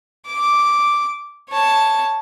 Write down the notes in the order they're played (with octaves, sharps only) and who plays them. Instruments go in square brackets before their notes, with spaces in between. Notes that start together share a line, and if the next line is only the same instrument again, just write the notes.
[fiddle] D6
C#5 A5